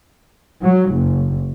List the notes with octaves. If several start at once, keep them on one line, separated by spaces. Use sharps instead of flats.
F#3
F#1